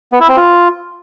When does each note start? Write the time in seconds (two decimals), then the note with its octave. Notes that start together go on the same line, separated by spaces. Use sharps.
0.12 B3
0.20 E4
0.29 C4
0.37 F4